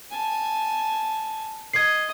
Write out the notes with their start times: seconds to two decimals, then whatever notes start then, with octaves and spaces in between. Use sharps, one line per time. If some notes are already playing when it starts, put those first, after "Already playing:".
0.11 G#5 A5
1.73 D#5 G#6 C7